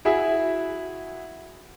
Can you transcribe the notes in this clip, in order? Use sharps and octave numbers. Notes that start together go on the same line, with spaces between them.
E4 F#4 G#4 E5